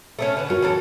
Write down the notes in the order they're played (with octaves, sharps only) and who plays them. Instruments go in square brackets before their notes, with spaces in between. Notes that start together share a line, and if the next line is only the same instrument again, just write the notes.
[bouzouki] A3 C4 C#4
D3 B4
[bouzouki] C#4 [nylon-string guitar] F#4 A#4 A5
[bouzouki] E3 C#4 A4